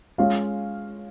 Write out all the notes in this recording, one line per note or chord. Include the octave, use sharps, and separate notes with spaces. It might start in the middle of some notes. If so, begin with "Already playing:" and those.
G#3 C#4 F4 F5